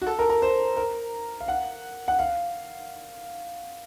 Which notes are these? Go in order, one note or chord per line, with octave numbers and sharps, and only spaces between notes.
F#4
A4
A#4
A#4
C5
A#4
F5
F#5
F#5
F5